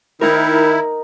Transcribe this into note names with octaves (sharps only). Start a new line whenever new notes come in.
D#3 D#4 E4 A#4